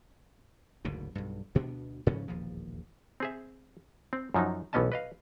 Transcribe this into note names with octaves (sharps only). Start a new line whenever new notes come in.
F#1 D2 G#2 B2
B1 G2
D2 B2 B3 D4
G#2 C#3 F3 C#4
E1 A#1 D#2 F3
C4 G#4 E5
C4
F#2 F3 F#3 D#4
B1 E3 B3 C#4 D#5 A5
B4 D#5 F5